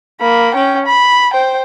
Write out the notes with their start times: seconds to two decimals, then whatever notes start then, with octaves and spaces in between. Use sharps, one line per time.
0.20 A#3 B5
0.54 C#4 G5
0.86 B5
1.33 C5 G5